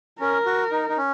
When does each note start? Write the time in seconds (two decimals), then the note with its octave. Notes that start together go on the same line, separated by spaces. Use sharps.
0.20 C#4 A#4
0.46 F#4
0.71 D#4
0.89 D#4
0.97 C#4